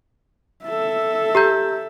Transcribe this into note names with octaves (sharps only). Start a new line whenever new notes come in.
A4 E5
G4 A#5 G6